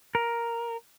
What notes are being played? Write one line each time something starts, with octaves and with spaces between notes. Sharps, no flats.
A#4